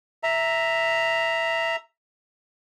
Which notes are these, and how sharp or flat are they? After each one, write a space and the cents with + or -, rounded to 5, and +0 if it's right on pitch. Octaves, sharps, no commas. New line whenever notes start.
E5 +0 A#5 +0